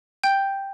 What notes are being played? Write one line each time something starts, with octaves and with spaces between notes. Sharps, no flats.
G5 G6